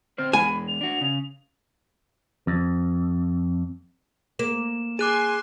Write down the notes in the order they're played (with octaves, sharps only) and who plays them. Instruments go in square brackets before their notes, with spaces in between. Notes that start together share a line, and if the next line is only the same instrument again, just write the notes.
[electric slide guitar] D3 C4 C5 [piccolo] F6
[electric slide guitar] E2 G#2 G#3 [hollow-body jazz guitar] G#5 [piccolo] B5
[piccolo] F7
[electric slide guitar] D4 F#4
C#3
[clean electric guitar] F2
[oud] A#3 [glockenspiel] E7
[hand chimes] G#4 [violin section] G#5 C6 [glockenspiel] D6 F#6 D#7